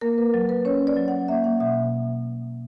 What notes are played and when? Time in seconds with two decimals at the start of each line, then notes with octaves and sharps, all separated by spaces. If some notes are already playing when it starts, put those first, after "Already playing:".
0.01 A#3 A#4
0.18 B4
0.34 F#3
0.49 B4
0.65 C#4 C#5
0.87 D5
0.97 F#3
1.08 F#5
1.28 A#3 E5
1.44 F#5
1.60 B2 E5